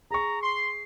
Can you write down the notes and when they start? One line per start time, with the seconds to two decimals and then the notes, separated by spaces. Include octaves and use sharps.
0.11 G#4 A#5 C#6
0.42 C6 C7